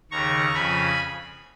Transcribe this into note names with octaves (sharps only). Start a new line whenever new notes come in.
D#2 C#3 A#5 C#6
F2 C#3 G#5 B5